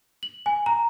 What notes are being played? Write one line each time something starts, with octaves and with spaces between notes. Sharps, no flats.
F#7
G#5
A#5